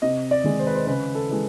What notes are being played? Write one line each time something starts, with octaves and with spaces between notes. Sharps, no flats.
C3 D#5
D5
D#3 G#3
C5
B4
C5
C#3 B4
A4
E3 G#3 B4